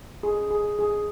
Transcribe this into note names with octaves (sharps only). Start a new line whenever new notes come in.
G#4
G#4
G#4